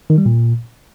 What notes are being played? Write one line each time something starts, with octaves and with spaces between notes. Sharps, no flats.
D#3
G3
A#2